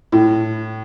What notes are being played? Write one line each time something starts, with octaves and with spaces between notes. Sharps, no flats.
A2